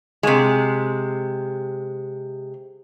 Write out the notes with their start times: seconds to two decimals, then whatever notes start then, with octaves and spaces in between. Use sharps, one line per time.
0.23 C3 G#3